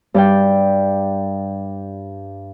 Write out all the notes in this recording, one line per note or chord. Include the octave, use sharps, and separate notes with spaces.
G2 D5 G5